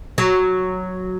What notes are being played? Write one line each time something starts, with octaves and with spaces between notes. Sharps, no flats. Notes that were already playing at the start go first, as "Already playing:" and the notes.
F#3